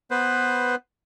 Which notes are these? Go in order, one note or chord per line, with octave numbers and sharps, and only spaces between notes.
B3 B4 C5